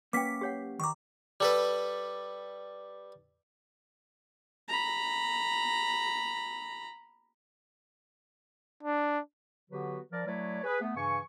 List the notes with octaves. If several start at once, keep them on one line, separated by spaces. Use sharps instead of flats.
F#3 A#3 C#4 B4 G5 D6 B6
G4 C#5 F#5
D#3 A#5 C#6 D6
G3 A4 B4
A#5 B5
D4
D3 F#3 B3 F#4 G4 B4
F3 A#4 D5
F#3 A3 E4 B4 C#5 D5
G#4 B4
A3 B3
G2 C#3 E3 G#5 C#6